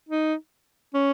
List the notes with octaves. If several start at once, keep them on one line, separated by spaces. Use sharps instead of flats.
D#4
C#4